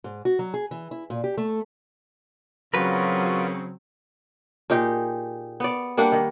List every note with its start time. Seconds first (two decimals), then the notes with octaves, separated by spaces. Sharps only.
0.04 G#2
0.25 F#4
0.39 F#3
0.54 G#4
0.71 E3
0.91 E4
1.10 A#2
1.24 G4
1.38 A3
2.74 C#3 F#3 C4 F4 F#4 A#4 B4
4.70 A#2 D#4 G4 G#4
5.60 B3 D5
5.97 G3 A#3 D4 F#5
6.12 D#3